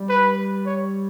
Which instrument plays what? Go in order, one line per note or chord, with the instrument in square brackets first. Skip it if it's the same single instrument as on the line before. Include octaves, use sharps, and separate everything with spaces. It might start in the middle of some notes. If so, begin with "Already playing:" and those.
Already playing: [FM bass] G3
[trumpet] B4
C#5